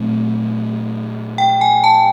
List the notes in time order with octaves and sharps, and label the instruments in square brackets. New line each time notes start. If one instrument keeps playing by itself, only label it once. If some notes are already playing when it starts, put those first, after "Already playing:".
Already playing: [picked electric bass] A#2 F#3 A3 C4
[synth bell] G5
G#5
A5